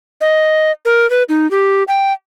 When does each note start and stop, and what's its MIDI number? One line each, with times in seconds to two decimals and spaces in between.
0.21 0.72 75
0.85 1.09 70
1.10 1.23 71
1.29 1.49 63
1.51 1.83 67
1.88 2.13 79